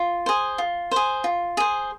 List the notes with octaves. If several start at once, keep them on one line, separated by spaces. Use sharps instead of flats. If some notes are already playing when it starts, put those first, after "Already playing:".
Already playing: F4
G#4 C5
F4
G#4 C5
F4
G#4 C5